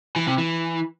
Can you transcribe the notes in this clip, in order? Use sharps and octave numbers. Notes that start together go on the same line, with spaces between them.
E3
C3
E3